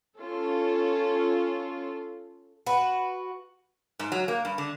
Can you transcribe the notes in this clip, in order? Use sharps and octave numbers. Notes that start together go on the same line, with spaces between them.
C#4 F4 A4
F#4 B4
G#2
F#3
A#3
G2
D3